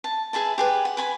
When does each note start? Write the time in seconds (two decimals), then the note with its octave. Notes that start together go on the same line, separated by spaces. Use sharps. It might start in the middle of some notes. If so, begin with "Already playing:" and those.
0.04 A5
0.33 G#4 B4 E5 A5
0.58 G4 G#4 B4
0.85 F#5
0.97 B4 G#5 B5